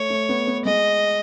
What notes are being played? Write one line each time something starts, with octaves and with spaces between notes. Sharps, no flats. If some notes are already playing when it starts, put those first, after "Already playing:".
Already playing: A3 C#5
A3
B3
B3
G#3 D#5